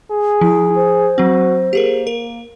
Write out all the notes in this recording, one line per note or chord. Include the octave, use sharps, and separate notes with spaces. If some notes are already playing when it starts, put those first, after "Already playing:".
G#4
F3 E4
C5
F#3 C4 F#4
A#3 G4 G#4 A#4
A#4